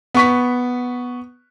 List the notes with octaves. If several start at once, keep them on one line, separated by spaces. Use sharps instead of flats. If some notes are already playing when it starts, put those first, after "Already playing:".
B3 C#6 B6